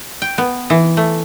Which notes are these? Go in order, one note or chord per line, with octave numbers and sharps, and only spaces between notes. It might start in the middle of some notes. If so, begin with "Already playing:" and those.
G5
B3
E3
A3